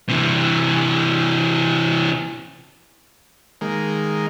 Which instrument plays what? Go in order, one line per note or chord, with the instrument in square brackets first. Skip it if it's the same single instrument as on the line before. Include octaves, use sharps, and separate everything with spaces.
[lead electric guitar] C3 E3
[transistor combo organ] D#3 G#3 A#3